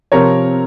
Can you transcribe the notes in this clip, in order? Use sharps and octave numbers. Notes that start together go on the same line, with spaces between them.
C3 F3 C4 A#4 C#5